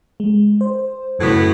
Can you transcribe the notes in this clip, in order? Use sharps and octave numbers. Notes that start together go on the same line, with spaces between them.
G#3
C5
F#2 A2 C#3 B3 F#4